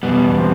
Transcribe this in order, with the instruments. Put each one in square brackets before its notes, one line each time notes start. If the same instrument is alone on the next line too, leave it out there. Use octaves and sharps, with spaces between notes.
[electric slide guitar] E2 B2 G3 [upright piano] B3
[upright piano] C4